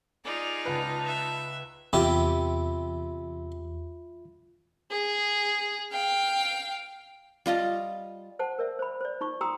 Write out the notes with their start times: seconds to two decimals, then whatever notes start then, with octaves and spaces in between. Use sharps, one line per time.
0.25 D#4 F4 G#4 D5
0.65 C#2 B4 A5
1.05 E5
1.93 E2 C3 F4 G4 E5 B5
4.91 G#4
5.92 F5 G5
7.46 G3 F4 D#5 A5
8.39 C5 F#5 A5
8.59 A#4 D5 E5
8.79 C5 B5
9.01 C5 D5
9.21 D#4 F4 C#6
9.41 F#4 G5 A#5 C6 D#6 E6